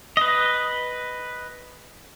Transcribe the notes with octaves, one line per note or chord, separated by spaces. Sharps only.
B4 D#5